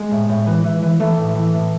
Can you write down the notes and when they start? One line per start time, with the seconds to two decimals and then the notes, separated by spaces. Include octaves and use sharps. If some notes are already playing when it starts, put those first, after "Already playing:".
Already playing: G#3
0.11 A2
0.29 A2
0.47 E3
0.64 E3
0.82 E3
1.00 E3 A3
1.17 A2
1.35 E3
1.54 A2